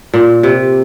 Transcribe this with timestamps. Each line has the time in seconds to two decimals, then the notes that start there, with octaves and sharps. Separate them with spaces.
0.14 A#2
0.43 C3